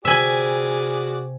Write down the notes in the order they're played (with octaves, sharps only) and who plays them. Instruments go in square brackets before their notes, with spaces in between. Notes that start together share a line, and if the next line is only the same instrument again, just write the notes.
[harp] C3 [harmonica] F#4 G#4 D5 [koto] E5 G#5